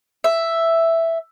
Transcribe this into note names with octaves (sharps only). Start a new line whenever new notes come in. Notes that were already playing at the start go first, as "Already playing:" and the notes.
E5